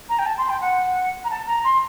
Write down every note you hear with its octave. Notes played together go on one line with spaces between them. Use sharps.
A#5
G5
A5
C6
G5
F#5
A#5
A5
A#5
C6